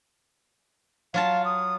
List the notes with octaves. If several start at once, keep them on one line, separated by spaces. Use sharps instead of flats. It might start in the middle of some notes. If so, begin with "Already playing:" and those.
F#3 F4 F5 A5
D#6